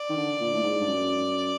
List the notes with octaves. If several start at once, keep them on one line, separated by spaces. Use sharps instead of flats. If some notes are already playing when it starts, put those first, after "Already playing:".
Already playing: D5
D#3
D3
A#2
A2
G#2
G2
F#2